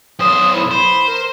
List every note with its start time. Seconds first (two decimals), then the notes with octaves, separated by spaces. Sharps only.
0.19 B1 C5 D#6
0.54 E4
0.71 C5 B5
1.06 A#4